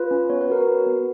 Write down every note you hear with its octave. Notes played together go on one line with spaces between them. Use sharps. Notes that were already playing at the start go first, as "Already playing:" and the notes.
Already playing: F4 B4
C#4
B3 C#5
B4
F#4 A#4
B4
F#4
B3